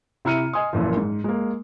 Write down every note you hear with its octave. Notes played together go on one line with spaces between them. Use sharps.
C3 E4 A#5 F6 C#7 D#7
D#5 G#5 C6 D#6
F#1 F#2 A#2 E3 F3
G#2
G#3 A#3